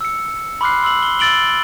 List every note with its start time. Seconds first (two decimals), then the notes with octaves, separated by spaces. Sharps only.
0.01 E6 C#7
0.61 B5 C6 D6 F6 F#6 C7
0.82 C6 E6 F#7
1.02 G7
1.19 E6 A6 D7 F#7 G7